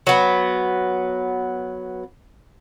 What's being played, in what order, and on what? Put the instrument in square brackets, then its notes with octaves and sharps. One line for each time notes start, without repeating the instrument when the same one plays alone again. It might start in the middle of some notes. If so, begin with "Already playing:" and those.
[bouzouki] F#3 B3